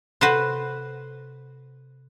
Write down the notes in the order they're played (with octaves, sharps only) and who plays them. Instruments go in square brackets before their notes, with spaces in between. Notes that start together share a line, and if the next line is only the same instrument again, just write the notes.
[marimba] C3 A4 [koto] F#4 B4 C5